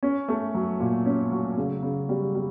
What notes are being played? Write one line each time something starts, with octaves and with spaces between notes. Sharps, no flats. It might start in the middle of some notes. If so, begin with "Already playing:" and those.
C#4
A3
F#3
A#2
C#4
F#3
C#3
C#3
G3
G3